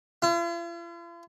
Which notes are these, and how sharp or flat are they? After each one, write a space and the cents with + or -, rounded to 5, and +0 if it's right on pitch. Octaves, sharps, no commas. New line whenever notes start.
F4 -45